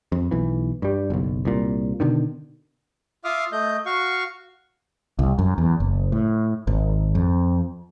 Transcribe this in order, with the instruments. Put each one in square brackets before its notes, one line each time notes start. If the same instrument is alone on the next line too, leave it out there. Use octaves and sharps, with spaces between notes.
[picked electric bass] F2
B1 E3
G2 G3
F#1 B1
C2 A#2
B2 D3 D#3
[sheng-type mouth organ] F4 E5 F5 D6 D#6 F6
A3 D#5 G6
F#4 F5 C#6
[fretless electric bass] C2
F#2
E2
F#1
A2
G#1
F2